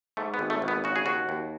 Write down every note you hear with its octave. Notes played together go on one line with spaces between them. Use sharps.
G#2 A3
B3
G#1
A3
G#1
B3
C#3 F#4
G#4
D#2 F#4
D#2